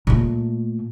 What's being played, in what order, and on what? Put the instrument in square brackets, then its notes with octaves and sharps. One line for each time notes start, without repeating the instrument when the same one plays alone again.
[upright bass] A#2 A3